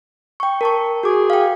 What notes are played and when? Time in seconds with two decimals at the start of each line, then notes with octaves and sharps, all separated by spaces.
0.40 G5 C#6
0.61 A#4 A5 C#6
1.03 F#4 G#4 D6
1.30 F5 G5